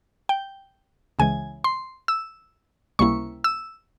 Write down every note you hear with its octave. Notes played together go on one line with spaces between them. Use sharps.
G5
C#2 C#3 E3 G#3 G#5
C6
E6
C#2 C3 G3 A#3 E4 C#6
E6